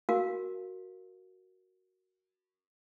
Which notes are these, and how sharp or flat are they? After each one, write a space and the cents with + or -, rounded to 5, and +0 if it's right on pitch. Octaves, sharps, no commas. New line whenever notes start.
F#4 +0 A#4 +0 F5 +0